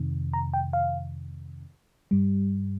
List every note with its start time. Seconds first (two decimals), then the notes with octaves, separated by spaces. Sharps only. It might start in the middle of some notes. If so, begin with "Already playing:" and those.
Already playing: F2 C3 D#3
0.33 A#5
0.54 G5
0.73 F5
2.11 G2 G3